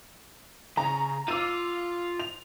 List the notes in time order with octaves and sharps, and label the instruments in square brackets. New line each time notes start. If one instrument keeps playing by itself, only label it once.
[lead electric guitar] C#3 [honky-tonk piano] A#5
[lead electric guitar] F4 F5 [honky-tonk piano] D6 E6 D#7
[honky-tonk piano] F7